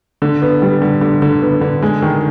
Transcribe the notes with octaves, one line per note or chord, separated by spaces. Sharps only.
D3
B3
G3
D3
D3
D3
B3
D3
G#3
D#3